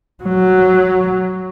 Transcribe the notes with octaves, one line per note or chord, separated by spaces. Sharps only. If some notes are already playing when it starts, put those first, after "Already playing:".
F#3